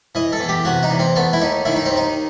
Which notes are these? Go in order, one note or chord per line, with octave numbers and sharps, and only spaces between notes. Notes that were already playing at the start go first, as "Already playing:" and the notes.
E3 D#5
A4
E2
G4
C3 F#4
D#4
E2
C4
A3 B3
E4
D#2 D#4
D#3 E4
D#4
D#2 C4
D#4